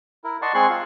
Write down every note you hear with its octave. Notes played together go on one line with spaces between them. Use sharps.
E4 A#4
D5 D#5 F#5 A5 C6 C#6
G#3 C4 G#4 C6 C#6 F#6
F4